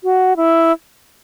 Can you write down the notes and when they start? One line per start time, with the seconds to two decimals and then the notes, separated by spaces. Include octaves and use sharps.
0.04 F#4
0.36 E4